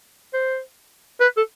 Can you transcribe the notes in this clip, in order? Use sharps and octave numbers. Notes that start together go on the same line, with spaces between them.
C5
B4
A4